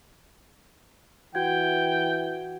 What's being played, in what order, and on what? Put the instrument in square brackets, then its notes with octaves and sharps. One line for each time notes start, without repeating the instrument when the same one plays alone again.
[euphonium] E3 [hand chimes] F#4 F#5 G#6 [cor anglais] G5